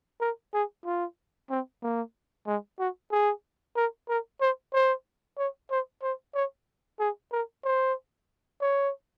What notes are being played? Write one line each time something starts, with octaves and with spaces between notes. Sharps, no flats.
A#4
G#4
F4
C4
A#3
G#3
F#4
G#4
A#4
A#4
C5
C5
C#5
C5
C5
C#5
G#4
A#4
C5
C#5